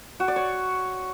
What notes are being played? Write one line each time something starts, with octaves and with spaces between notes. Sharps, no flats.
F#4
D5
C#5